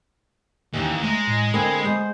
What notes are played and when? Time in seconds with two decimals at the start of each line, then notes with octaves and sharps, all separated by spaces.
0.73 D#2 E3 G3 C#4
1.03 G#3 A3 C#5 A#5
1.28 A2
1.54 D3 A#3 C4 G#5 B5 D#6 C7
1.85 G#3 B3 C5